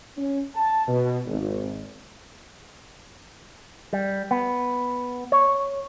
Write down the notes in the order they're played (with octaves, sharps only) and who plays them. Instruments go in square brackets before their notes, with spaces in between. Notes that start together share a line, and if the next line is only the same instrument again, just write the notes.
[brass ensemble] C#4
A5
B2
G#1
[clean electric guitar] G3
B3
C#5